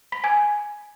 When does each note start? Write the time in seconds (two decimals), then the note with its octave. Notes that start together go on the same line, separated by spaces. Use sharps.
0.12 B5 B6
0.24 G#5 G#6